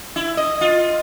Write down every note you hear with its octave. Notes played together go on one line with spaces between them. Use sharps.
E4
D#5
F4